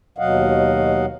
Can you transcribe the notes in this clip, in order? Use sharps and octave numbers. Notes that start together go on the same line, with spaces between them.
D#2 B2 F#3 D#5 F5 F#5